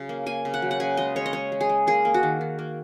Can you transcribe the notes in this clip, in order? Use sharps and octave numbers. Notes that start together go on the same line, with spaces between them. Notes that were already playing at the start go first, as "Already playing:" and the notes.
Already playing: C#3 F#3
A#3
A#3 G#5
C#3
F#5
F#3
F#5
C#3 G#5
G#3 D#5
G#3 C#5
D#5
G#3 C#5
G#3
G#4
G#3
A#3 G#4
A#3
F#4
D#3
D#3
A#3